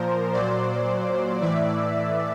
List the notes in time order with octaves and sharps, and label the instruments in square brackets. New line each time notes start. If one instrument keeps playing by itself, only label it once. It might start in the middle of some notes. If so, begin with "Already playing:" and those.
Already playing: [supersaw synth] A#2 F3 A#4 C5
A#2 F#3 C5 D5
A2 E3 D5 E5